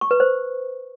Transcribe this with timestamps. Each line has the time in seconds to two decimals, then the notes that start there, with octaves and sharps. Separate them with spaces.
0.01 C#6
0.11 B4
0.20 C5